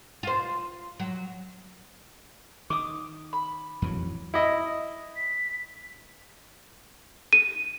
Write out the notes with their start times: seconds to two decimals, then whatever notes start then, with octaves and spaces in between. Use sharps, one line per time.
0.23 F4 C5
1.00 F#3
2.70 D#3 D6 D#6
3.33 B5
3.82 F2 E3 F#3
4.34 E4 D#5
5.16 B6
7.33 D#7